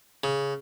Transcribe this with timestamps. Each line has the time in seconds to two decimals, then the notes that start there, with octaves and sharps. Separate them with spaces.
0.24 C#3